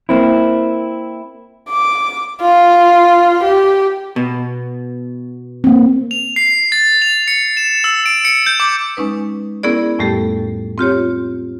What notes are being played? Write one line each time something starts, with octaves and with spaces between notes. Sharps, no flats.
A#3 C4 E4
D6
F4
G4
B2
A#3 C4
F7
C7
A6
F7
C#7
E7
E6
D7
C#7
G6
D6
G#3 C#4 D#4 B4
B3 C#4 E4 G#4 A#4 D5
F2 A2 G3 A3 G4 A4
C4 F4 G4 C#5